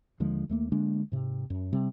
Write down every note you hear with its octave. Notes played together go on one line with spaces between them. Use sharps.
D#2 D3 F3 G#3
D#2 A3 A#3
D3 G#3 A#3 D4
G#2 C3
F#2
C3 G3 C4